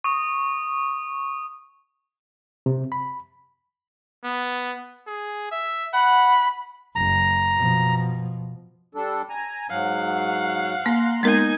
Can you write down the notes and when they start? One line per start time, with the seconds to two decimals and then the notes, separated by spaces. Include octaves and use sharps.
0.04 C#6 D#6
2.66 C3
2.92 B5
4.24 B3
5.07 G#4
5.51 E5
5.93 F#5 B5
6.96 F#1 A#5
7.57 B2 F3
8.95 G3 D4 A4
9.29 G#5 A#5
9.70 G#2 F#3 F5 F#5
10.86 A#3 A#5 C6 F#6
11.23 G#3 B3 D#4 A#4 G#5